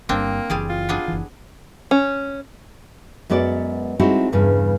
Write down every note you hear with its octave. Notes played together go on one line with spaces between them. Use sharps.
G1 G2 A#3 C4 D4
F#1 C2 E3 G3 G#4 D5
F4
B3 D4 G#4
F#1 E3
C#4
F#2 G#3 B3 F#4 D5
G3 G#3 C4 D#4 E4 F#4
E2 G2 C#3